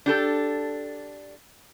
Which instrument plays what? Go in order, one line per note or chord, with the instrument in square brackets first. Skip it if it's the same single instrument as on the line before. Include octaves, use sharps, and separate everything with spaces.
[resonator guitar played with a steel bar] D4 G4 A4